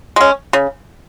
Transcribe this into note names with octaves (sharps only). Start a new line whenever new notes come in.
G#3 C#4
C#3